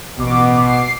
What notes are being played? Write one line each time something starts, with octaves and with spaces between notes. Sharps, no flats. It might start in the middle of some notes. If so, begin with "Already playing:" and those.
A1 B2 D6
D6 C7